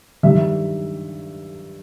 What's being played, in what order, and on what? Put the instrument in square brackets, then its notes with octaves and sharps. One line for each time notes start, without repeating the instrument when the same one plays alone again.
[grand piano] G2 D#3 G3 E5